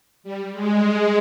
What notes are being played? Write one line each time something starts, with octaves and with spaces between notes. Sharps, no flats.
G3
G#3